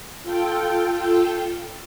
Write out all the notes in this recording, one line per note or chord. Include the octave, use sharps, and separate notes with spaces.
F4 A4 G5